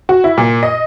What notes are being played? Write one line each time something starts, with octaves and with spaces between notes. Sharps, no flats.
F#4
E4
A#2
D#5